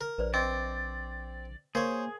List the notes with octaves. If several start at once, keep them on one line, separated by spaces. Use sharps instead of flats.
A#4
A#1 B4 C5 D5
C4 D5 D#5
A#3 G#4 A#4 C5 C#5 F5